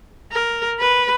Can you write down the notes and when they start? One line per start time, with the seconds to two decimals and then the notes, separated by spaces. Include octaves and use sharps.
0.32 A#4
0.80 B4